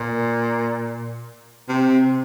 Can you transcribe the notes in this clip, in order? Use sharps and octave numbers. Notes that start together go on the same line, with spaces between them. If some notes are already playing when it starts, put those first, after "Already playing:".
Already playing: A#2
C3